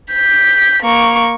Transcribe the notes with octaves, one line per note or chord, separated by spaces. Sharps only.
G6 B6
A#3 C#6